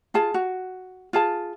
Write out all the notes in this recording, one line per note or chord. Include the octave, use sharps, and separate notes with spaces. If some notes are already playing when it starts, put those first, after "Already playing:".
F4 G#4 A5
F#4
F4 G#4 A5